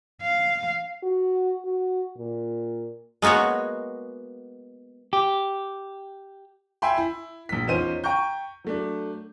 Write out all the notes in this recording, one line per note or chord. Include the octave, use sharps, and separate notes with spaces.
F5
F#4
F#4
A#2
G#3 A#3 B3 F#4 C#5
G4
E5 G5 G#5 B5 C6
E4
A#1 B6
E2 C#4 D#4 F4 C5 D#7
G5 A#5 C#6 G6
F#3 A3 D4